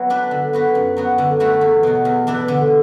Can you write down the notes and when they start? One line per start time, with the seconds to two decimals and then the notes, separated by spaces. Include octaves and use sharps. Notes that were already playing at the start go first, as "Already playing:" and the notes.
Already playing: F#3 B3 E4
0.10 D4 B4
0.31 D3
0.53 B3 F#4 B4
0.75 F#2
0.97 F#3 B3 F#4
1.18 D3
1.40 A3 F#4 B4
1.61 E2
1.83 B2 F#3
2.05 E2
2.27 E3 D4 B4
2.48 D3